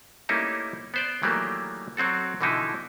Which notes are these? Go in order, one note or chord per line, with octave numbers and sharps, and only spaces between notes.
G3 A3 A#3 C#4 D#4 E4
B3 C5 D5
D#3 E3 F#3 G3 A3 A#3
F#3 C4 F#4 A4
B2 D3 E3 F3 D#4 E4